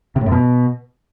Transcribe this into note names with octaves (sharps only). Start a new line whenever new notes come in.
C3
A2
F#2
B2